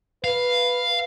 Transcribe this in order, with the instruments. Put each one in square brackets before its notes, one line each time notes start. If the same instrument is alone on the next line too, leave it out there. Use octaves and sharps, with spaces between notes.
[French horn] B4 [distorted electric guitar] F5